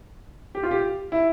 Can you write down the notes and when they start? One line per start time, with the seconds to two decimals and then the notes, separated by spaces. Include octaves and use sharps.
0.55 G4
0.63 F4
0.71 G4
1.12 E4